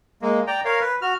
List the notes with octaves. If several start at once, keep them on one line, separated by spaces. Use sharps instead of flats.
G#3 A#3
D5 G5 A#5
A#4 C#5 F5
B4
F#4 F6